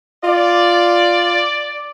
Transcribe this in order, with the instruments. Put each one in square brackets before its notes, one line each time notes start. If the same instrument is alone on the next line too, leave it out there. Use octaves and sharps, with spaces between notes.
[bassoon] F4 [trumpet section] D5